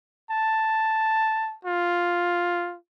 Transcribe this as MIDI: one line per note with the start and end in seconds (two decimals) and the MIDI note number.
0.31 1.55 81
1.65 2.76 65